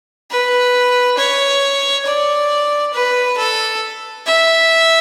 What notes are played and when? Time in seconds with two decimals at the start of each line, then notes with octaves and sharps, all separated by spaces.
0.31 B4
1.18 C#5
2.06 D5
2.94 B4
3.38 A4
4.26 E5